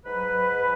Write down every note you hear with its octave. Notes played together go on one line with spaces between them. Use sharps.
G#2 F#3 B4